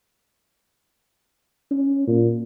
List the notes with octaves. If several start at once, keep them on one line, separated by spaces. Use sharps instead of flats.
C#4
A#2